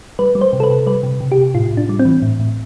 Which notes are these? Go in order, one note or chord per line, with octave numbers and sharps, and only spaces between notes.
G3 B4
G3
C5
C3
A4
B4
C3
G3 B4
C3
C3
G4
C3
A2 F4
A2
D4
G3
C4
E3
A2
A2